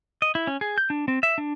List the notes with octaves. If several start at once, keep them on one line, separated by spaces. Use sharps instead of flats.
D#5
E4
C#4
G#4
G6
D4
C4
E5
D4